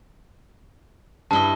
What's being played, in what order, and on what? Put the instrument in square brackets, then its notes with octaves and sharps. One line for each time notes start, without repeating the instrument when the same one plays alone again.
[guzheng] G2 E4 D#5 [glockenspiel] A5 G7